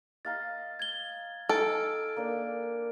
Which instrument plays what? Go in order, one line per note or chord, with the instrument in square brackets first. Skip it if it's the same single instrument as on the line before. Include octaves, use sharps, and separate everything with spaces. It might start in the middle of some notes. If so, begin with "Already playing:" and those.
[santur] D#5 F5 A#5 [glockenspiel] A6
[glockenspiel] G#6 G7
[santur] D#4 G#5 [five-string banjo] A4 [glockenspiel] F6 D7
[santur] A#3 D4